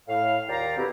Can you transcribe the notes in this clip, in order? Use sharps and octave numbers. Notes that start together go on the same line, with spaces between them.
A2 F5
D#2 F4 D5 F5 G5 A#5
B2 D3 C4 E4 G4